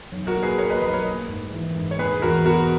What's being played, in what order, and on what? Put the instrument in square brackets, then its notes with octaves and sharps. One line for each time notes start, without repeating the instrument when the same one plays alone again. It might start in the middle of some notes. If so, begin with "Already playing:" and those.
[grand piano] B1
[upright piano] F#4 A#4
[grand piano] A#3
[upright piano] G#4 B4
[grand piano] A#3 [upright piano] A#4 C#5
[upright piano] B4 D#5
[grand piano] B1 [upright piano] B4 D#5
[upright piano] A#4 C#5
[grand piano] A#3
G#2
E3
G#2
[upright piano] C#5
[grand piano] E1 [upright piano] G#4 B4
[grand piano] E2 [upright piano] F#4 A#4
[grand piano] B2 [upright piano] F#4 A#4